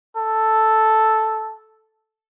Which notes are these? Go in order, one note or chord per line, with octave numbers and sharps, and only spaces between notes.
A4